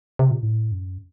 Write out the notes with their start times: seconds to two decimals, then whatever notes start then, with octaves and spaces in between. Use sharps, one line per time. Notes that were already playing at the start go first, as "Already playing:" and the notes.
0.19 C3
0.31 A#2
0.43 A2
0.72 F#2